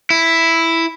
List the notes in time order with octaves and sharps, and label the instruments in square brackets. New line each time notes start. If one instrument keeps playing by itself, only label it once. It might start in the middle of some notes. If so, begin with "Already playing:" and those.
[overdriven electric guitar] E4